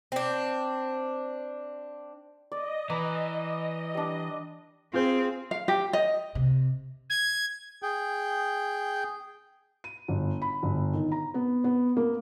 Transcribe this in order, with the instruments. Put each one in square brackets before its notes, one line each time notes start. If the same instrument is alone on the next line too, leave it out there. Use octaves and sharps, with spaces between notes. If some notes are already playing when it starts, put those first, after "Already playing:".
[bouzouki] C4 D4
[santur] D5 [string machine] D#5
[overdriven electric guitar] E3 [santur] B4 A#5 D6
[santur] G3 D4
[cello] C4 [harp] F4 G#4 C5
[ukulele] F5
G4
D#5
[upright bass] C3
[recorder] G#6
[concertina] G#4 G5
[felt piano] D#7
G1
B5
G1
D#3
A#5
B3
B3
A#3